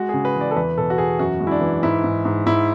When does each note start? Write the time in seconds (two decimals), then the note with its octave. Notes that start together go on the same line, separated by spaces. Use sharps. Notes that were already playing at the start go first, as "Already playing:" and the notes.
Already playing: G#3 F#4
0.09 C#3 G#4
0.25 B4
0.36 E3 D5
0.51 A4
0.56 E2 B4
0.78 B2 A4
0.90 F#4
0.98 E2 G#4
1.19 F#2 F#4
1.40 G#3
1.47 E4
1.51 D4
1.61 E3
1.83 G#2 E4
2.04 G#2
2.25 G#2
2.46 G#2 E4